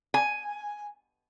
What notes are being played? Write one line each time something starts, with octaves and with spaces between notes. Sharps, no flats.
G#5